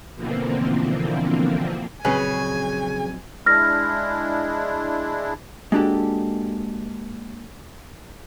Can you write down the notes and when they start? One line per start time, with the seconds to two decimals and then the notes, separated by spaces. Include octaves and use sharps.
0.16 B2 D3 E3 F3 A#3 C4
2.05 A#1 C#3 F#3 C4 C#4 G#4 B4 G#5
3.46 G#3 D4 E4 F6 A#6
5.72 G#3 A#3 D4 F#4 G4 A4